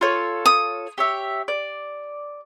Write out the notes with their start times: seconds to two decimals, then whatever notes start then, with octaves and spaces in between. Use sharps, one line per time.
0.01 F4 A4 C#5
0.46 D#6
0.98 G4 C#5 E5
1.48 D5